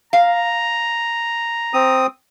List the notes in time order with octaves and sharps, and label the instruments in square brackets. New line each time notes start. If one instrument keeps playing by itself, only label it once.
[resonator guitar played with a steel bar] F5 [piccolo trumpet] A#5
[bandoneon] C4 D#6